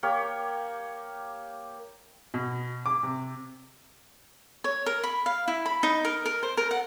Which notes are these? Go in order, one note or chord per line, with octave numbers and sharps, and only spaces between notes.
A#3 G4 A#4 C#5
B2
D6
C3
C#5
A#4
B5
F5
E4
B5
D#4
A#4
A#4
C5
A#4
F#5